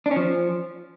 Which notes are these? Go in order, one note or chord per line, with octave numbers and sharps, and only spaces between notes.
D4
C#4
F3